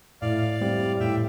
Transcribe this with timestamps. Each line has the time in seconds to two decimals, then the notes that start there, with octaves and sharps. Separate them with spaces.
0.22 A2 D5 F5
0.61 G3 C4 G4
1.00 A2 E5 G5